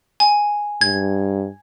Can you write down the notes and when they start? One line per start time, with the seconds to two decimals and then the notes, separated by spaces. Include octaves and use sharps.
0.20 G#5
0.81 G2 G#6